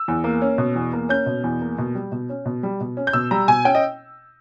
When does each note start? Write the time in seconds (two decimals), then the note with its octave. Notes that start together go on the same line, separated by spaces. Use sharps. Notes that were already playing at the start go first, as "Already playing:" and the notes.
Already playing: E6
0.08 E2
0.24 A#3
0.42 C#4
0.58 B2
0.76 E2
0.93 A#3
1.09 C#4 G6
1.26 B2
1.44 E2
1.61 A#3
1.78 B2
1.95 G3
2.12 B2
2.29 C#4
2.46 B2
2.63 G3
2.80 B2
2.97 C#4
3.07 G6
3.13 B2 E6
3.31 G3 A#5
3.48 B2 G#5
3.65 C#4 G5
3.75 D#5